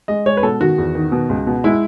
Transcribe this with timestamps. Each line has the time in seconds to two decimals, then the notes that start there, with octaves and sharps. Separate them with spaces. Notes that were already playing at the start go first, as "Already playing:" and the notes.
0.08 G#3 D#5
0.26 G#3 C#5
0.37 B4
0.43 B2 A4
0.60 D#3 F#4
0.78 E2
0.95 D#3
1.12 B2
1.30 C#2
1.47 B2
1.64 G#3 E4